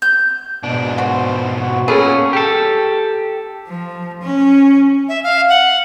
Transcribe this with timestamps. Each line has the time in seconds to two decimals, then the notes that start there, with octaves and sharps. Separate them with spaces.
0.02 G6
0.63 G#2 B2 D4
0.98 F#4 C5
1.60 F#4
1.88 A#2 B3 C#4 G#4 A4 B5
2.33 G4 A4
3.68 F3
4.22 C#4
5.09 E5
5.24 F5
5.49 F#5